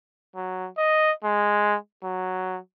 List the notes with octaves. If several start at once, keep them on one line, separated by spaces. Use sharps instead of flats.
F#3
D#5
G#3
F#3